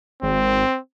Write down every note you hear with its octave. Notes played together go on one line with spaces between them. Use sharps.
G#1 C4